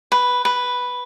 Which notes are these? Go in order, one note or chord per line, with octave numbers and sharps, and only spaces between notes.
B4
B4